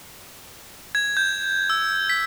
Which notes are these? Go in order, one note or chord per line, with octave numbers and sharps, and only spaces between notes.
G#6
G6
E6
B6